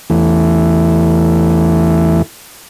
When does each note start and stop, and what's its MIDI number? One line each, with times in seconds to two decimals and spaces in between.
0.10 2.22 40
0.10 2.22 52
0.10 2.22 57